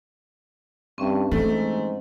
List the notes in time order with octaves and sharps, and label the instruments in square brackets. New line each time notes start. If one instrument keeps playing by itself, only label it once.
[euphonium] G2 [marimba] C4 C#4 E5
[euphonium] G#2 [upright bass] E3 [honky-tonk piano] A3